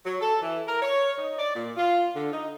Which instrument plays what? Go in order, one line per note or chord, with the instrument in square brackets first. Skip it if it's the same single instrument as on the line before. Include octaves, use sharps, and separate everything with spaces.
[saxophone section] F#3
A4
E3
A#4
C#5
D#4
D5
A#2
F4
D3
D#4